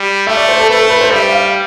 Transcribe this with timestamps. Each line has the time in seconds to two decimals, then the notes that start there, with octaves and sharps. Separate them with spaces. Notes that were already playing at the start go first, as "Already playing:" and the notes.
Already playing: G3
0.27 A3 E5
0.37 D5
0.49 C5
0.59 A4
0.70 A3 B4
0.79 A4
0.90 B4
1.01 C5
1.11 G3 E5
1.32 F5